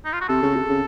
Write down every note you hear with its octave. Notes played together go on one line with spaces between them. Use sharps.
D#4
F4
F#4
C3 A4
C#3
C3
C#3